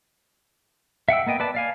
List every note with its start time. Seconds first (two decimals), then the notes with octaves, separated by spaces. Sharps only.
1.09 E5 F#5 G5 E6
1.27 A#3 B3 D#5 G5
1.40 B4 D5 A5
1.55 D5 F5 G#5